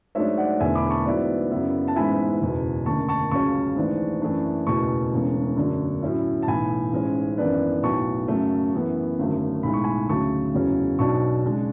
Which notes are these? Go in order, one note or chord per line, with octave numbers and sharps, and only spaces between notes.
G#2 F#3 A3 D4 C#5 E5
D5 F#5
E1 E2 D3 A3 E5 G#5
B5 D6
A5 C#6
G#2 F#3 B3 E4 B4 D5
F#2 C#3 F#3 B3 E4
A5
A1 G#2 G#3 B3 E4 G#5 B5
F#1 E2 B2
F#1 F#2 D3 A3 A5 C#6
A5 C#6
C#2 C#3 F#3 C#4 A5 C#6
G#1 G#2 E3 A3 D4
F#2 E3 A3 D4
F#1 E2 B2 A3 A5 C#6
E1 E2 C#3 G#3
F#2 D3 F#3 A3 D4
A2 F#3 C#4 E4
A5
B1 A2 E3 G#5 B5
A1 G#2 G#3 C#4
G#1 F#2 E3 B3 D4 B4 D5
B1 A2 F#3 B3 A5 C#6
F#2 C#3 F#3 A3 C#4
F#2 E3 B3
G#1 F#2 D3 F#3 A3
B1 A2 G#3 B5
C#6
G#5 B5
D2 C#3 F#3 A3 A5 C#6
F#1 E2 C#3 F#3 C#4
B1 B2 F#3 B3 D4 A5 C#6
C#3 G#3 D4